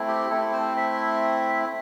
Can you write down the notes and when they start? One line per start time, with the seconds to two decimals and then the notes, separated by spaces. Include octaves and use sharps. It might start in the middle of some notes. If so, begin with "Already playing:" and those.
Already playing: A3 C4 E4
0.08 G4
0.31 A3 C4 E4 A4
0.53 C5
0.77 E5